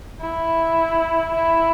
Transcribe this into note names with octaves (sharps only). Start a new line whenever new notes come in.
E4
E4